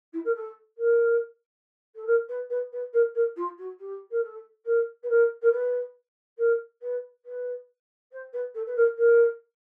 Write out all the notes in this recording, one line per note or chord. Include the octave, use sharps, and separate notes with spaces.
E4
A#4
A4
A#4
A4
A#4
B4
B4
B4
A#4
A#4
F4
F#4
G4
A#4
A4
A#4
B4
A#4
A#4
B4
A#4
B4
B4
C5
B4
A4
B4
A#4
A#4